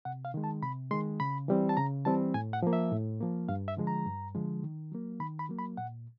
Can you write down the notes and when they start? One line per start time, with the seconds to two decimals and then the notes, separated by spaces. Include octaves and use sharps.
0.05 C3 F#5
0.25 F5
0.34 D#3 G#3
0.44 A5
0.62 C3 B5
0.91 D#3 G#3 C6
1.20 C#3 B5
1.48 E3 G3 C4
1.69 A5
1.77 C#3 A#5
2.05 E3 G3 C4 A5
2.34 A2 G#5
2.53 F#5
2.63 F3 A#3
2.73 E5
2.92 A2
3.20 F3 A#3
3.49 G2 F5
3.68 E5
3.77 D3 F3 G#3
3.87 A#5
4.06 G2
4.34 D3 F3 G#3
4.63 D#3
4.92 F#3 A#3
5.20 D#3 B5
5.39 B5
5.49 F#3 A#3
5.59 B5
5.77 A#2 F#5